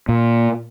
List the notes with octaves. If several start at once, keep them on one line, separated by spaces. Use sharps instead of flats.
A#2